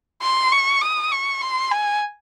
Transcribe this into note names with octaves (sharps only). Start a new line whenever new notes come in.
C6
C#6
D#6
C#6
C6
G#5